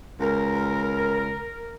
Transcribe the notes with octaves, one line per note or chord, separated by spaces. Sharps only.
C#2 A#4